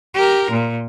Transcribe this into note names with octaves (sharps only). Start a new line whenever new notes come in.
G4 A#4
A#2